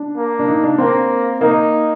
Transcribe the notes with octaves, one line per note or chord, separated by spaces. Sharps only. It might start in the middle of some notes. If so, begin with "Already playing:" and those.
Already playing: D4
A#3
D4
D#4
D4
A#3 C4
A#3 D#4